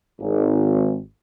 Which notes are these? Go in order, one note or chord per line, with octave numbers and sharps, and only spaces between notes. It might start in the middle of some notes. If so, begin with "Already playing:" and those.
G#1